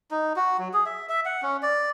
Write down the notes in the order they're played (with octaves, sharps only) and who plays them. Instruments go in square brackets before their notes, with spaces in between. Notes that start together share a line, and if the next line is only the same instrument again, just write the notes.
[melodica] D#4
F#4
F#3
G#4
E5
E5
F#5
C#4
D5